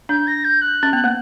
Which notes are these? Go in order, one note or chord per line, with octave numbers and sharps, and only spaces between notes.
D4 G6
A#6
G6
F#6
C#4
B3
A#3